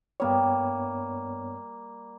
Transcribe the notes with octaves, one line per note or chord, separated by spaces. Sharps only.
G2 G3 A#3 B3 C#5